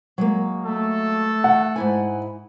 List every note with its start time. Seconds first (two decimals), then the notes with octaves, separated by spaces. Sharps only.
0.18 F#3 G#3 A#3
0.65 A3 A4
1.44 F#5
1.76 G#2 E4 G#5